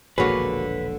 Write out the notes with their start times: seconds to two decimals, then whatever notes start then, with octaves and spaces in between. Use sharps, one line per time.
0.18 E1 A#1 D3 A#3 F#4 G#4 B4 C#5